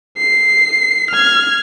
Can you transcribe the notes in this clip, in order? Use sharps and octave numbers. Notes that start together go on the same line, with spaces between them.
C7
F6 G#6